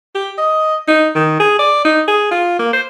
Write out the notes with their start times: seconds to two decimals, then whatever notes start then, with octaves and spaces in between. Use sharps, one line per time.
0.15 G4
0.38 D#5
0.88 D#4
1.15 D#3
1.40 G#4
1.59 D5
1.85 D#4
2.08 G#4
2.31 F4
2.59 A#3
2.73 C5